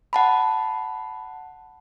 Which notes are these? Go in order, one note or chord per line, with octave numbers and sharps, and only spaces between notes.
F#5 A5 B5